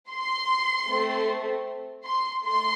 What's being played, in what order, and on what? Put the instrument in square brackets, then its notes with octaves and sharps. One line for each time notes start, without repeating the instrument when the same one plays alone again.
[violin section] C6
A3 C4 A4
C6
A3 C6